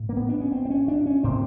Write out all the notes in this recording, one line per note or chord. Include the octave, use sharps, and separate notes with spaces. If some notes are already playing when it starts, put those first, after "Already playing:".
Already playing: A2
A#3
B3
D4
C#4
C4
C4
C#4
D4
C#4
A2 C4